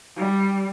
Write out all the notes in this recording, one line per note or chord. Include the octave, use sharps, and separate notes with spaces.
G3